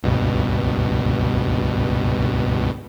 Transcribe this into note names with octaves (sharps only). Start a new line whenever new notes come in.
C#2 G2 B2